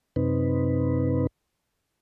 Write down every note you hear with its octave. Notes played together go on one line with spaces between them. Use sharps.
F#2 C3 C4 D#4 B4